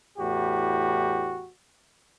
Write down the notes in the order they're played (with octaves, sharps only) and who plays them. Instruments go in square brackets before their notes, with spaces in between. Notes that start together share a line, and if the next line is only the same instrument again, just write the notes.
[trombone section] E2 A2 F#4 G4